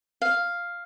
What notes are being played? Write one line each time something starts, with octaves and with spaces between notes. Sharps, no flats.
F5